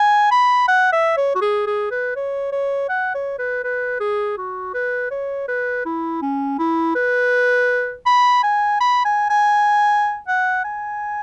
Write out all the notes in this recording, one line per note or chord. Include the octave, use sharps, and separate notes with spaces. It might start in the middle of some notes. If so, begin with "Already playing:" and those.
Already playing: G#5
B5
F#5
E5
C#5
F#4
G#4
G#4
B4
C#5
C#5
F#5
C#5
B4
B4
G#4
F#4
B4
C#5
B4
E4
C#4
E4
B4
B5
G#5
B5
G#5
G#5
F#5
G#5